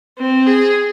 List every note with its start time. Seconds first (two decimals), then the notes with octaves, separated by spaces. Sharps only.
0.18 C4
0.47 G#4